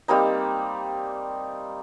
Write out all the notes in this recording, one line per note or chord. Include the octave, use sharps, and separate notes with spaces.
G3 A#3 C4 D#4